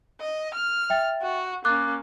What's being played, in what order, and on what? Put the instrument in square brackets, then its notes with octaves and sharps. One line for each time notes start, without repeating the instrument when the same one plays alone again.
[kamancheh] D#5
F6
[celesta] E5 G5 A6
[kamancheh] F#4
[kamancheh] A#3 C#4 [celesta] D6 F#6 A6